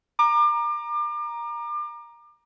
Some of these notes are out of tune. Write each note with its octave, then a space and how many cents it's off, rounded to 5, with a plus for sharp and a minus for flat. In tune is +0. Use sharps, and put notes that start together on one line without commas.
A#5 +10 D6 +35